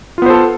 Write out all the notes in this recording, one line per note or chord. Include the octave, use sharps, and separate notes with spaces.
B3 F4 A4 C5